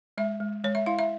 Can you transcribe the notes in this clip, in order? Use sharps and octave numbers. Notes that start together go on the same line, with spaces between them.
G#3 E5
G#3
G#3 C#5
E5
E4 F5
E5